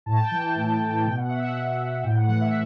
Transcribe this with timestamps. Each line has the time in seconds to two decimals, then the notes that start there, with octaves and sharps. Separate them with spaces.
0.06 A2 A5
0.17 G5
0.28 E3 A5
0.55 A2
0.80 E3
1.04 B2 G5
1.17 F#5
1.30 E5
1.43 F#5
1.54 B2
2.04 A2 G5
2.16 F#5
2.28 E3 F#5
2.41 E5